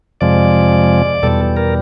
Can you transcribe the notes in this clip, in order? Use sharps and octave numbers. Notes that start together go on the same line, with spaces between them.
F2 C3 F3 G#3 D5
E2 B2 G3 A4
A#4